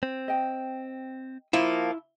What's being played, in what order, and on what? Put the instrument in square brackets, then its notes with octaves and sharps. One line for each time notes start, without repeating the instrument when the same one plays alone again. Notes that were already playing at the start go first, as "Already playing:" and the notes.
[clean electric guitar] C4
[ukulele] D#5 G5
[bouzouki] F3 A#3 [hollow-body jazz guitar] E4